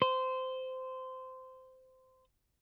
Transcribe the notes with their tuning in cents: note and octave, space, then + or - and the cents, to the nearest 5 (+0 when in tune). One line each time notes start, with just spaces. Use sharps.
C5 -15